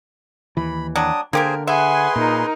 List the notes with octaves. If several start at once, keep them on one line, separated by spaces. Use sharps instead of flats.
D#2 E3 B5
F#3 G3 D4 D#6
D3 A#3 G4 G#4 A#4 C5 G#5
G#4 B4 E5 F#5 G#5 C6
A#2 D#4 A#4